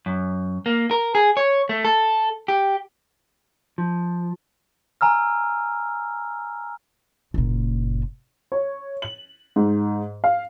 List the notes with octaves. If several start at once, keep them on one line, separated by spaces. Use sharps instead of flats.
F#2
A#3
A#4
G#4
C#5
A3
A4
G4
F3
G#5 A#5 E6 F6
F#1 A#2
C#5
F#7
G#2
F5